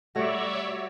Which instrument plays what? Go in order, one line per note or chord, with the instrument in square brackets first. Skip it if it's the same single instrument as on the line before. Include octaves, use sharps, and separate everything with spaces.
[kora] G3 A3 [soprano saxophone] F#4 [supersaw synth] C#5 D5 E5